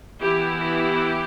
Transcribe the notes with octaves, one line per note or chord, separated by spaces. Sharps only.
E3 B3 E4 G4
G4